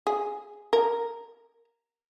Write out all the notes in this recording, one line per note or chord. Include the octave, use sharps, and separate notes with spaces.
G#4
A#4